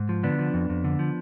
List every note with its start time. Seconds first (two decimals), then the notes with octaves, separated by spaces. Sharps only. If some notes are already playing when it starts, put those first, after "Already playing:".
Already playing: G#2
0.09 F3
0.23 D3 B3 D4
0.39 F3
0.54 F2
0.70 F2
0.84 D3
0.99 F3